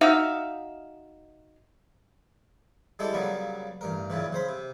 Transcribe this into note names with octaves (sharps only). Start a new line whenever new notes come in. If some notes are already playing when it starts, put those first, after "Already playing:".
D#4 F#4 E5 F5
G3 G#3 E4 G4 A4
C#3 F#3 G3 A#3 B3
A1 G2 A#4
F#2 A#2 C#3 E3
C#3 C5 B5
C3